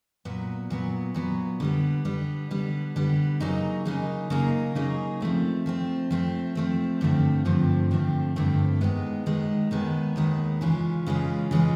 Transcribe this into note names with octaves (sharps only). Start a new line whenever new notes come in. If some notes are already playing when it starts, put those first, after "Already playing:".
A#2 F#3 B3
A#2 F#3 B3
A#2 F#3 B3
D3 G3 B3
D3 G3 B3
D3 G3 B3
D3 G3 B3
C#3 F#3 A#3 D#4 G#4
C#3 F#3 A#3 D#4 G#4
C#3 F#3 A#3 D#4 G#4
C#3 F#3 A#3 D#4 G#4
F3 A3 C4
F3 A3 C4
F3 A3 C4
F3 A3 C4
G2 D3 F3 A3 C4
G2 D3 F3 A3 C4
G2 D3 F3 A3 C4
G2 D3 F3 A3 C4
D#2 D#3 G#3 B3
D#2 D#3 G#3 B3
D#2 D#3 G#3 B3
D#2 D#3 G#3 B3
C#3 E3 G#3 C#4 F4
C#3 E3 G#3 C#4 F4
C#3 E3 G#3 C#4 F4